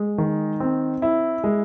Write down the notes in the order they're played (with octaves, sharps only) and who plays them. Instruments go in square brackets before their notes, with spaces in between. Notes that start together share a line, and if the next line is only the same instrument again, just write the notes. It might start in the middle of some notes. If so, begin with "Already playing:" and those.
Already playing: [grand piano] G#3
D#3
C4
E4
G#3